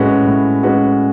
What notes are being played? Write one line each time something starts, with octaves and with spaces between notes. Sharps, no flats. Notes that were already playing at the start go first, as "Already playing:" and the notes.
Already playing: A2 G#3 C#4 F#4 B4
A2
G#3 C#4 F#4 B4